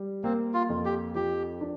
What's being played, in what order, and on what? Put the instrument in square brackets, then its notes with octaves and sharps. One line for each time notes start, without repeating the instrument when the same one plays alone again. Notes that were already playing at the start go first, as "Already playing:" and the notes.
Already playing: [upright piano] G3
[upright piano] A#3 [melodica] C4
[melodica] F4
[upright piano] F2
[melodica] G4
[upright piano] F3 [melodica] G4
[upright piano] D4